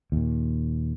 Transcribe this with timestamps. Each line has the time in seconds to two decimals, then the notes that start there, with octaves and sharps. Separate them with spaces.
0.12 D#2 A#2